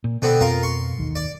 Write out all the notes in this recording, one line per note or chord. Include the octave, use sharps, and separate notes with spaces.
A#2
B2 D3 B3 C4
F2 C4 F4 A#4
C6 C#6
G#1 D#2 D#3
D5